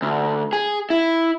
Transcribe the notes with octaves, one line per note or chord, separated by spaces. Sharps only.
D2
G#4
E4